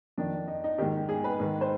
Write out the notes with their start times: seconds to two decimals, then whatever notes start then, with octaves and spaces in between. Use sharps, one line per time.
0.18 F2 D#3 D4
0.48 D#4
0.64 D#4
0.78 G#2 D#3 G4
1.09 G#4
1.24 B4
1.40 G#2 D#3
1.61 C5